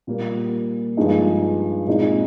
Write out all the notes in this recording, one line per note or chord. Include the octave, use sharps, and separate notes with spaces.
A#2 G3 A#3
G2 F3 G#3 D#4
A#2 G#3 C4 D#4